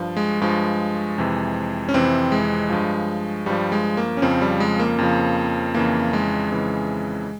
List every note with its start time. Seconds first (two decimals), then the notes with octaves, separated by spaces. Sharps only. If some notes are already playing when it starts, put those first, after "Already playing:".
Already playing: G2 F3
0.17 G#3
0.41 G2 F3 G#3
1.18 F2 C3 E3
1.89 C#4
1.94 F2 C3 E3 C4
2.32 G#3
2.70 G2 F3
3.46 G2 F3 G3
3.72 G#3
3.97 A#3
4.17 C#4
4.22 F2 C#3 F3 C4
4.41 G3
4.60 G#3
4.80 A#3
4.98 F2 C#3 F3
5.74 F2 C#3 E3 A#3
6.13 G#3
6.51 F2 C#3 E3